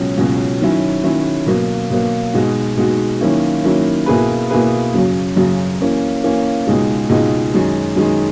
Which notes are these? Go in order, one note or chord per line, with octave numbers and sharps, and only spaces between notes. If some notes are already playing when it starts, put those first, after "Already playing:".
Already playing: C#2 B2 F#3 C#4
C#2 B2 F#3 C#4 F#4
D#3 F#3 C#4 E4
D#3 F#3 C#4 E4
B2 F#3 A#3
B2 F#3 A#3
B2 G#3 D#4 F#4
B2 G#3 D#4 F#4
D#3 F#3 A#3 C#4 E4
D#3 F#3 A#3 C#4 E4
B2 A#3 E4 G#4 B4
B2 A#3 E4 G#4 B4
F#2 C#3 F#3
F#2 C#3 F#3
E3 A#3 C#4
E3 A#3 C#4
C#2 B2 G#3 D#4
C#2 B2 G#3 D#4
F#2 D#3 G#3
F#2 D#3 G#3